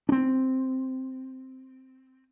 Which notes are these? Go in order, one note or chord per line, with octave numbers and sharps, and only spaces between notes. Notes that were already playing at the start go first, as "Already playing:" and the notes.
C4 D4